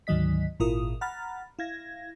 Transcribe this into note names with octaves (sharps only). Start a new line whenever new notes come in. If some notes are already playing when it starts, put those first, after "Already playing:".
D2 G#2 D#3 F#3 D#5 B6
G#1 A#2 E4 F4 A#4 D#6
F#5 A#5 B5 F6 A6
E4 F5 G#6 A#6